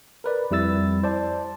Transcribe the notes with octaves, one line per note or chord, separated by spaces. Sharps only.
A#4 B4 D5
F2 G3 E4 E6 A6
C5 D5 A5